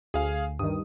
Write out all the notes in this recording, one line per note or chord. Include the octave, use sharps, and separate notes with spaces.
D2 G#4 F5 G#5
G2 D#3 D#6